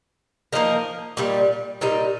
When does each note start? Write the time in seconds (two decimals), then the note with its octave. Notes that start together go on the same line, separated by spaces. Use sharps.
0.53 F3 A#3 D#4 A#4
1.17 A#2 G3 D#4
1.81 A#2 G3 D#4